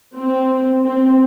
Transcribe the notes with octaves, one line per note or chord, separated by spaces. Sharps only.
C4
C4